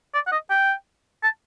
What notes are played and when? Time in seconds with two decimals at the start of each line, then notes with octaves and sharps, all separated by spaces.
0.14 D5
0.27 F#5
0.32 D#5
0.50 G5
1.23 A5